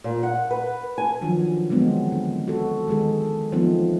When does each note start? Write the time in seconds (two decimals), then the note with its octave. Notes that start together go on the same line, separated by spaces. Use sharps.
0.04 A#2
0.23 F#5
0.51 B4
0.98 G#5
1.21 D#3 F3 F#3 D4
1.70 D3 E3 F#3 G#3 B3 C4
2.12 D3
2.48 F#4 A4
2.88 D#3 G#3 G#4 A4
3.52 E3 F3 A3 B3 C4 D#4